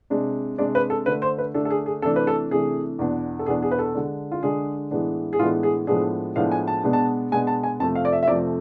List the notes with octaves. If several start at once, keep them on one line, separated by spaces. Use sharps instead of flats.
C3 G#3 D4
C3 G#3 D4 D5
B4
A4
D3 A3 D4 B4
C5
B4
D3 A3 D4 A4
A4
G#4
G#4
C3 E3 A3 D4 A4
B4
A4
C3 E3 A3 D4 G#4
E2 B2 B3 D4
A4
E2 B2 B3 D4 G#4
G#4
B4
A4
D3 G#3 D4
F4
D3 G#3 D4 G#4
A2 E3 G#3 B3 D4
G#4
A2 E3 G#3 B3 D4 F4
G#4
A2 F3 G#3 B3 D4 G#4
A2 F3 G#3 B3 D4 F5
G#5
A5
B2 G#3 B3 D4
A5
B2 G#3 B3 D4 G#5
A5
G#5
F2 C3 F3 A3 A5
F5
D5
E5
E5
F2 C3 F3 A3 D5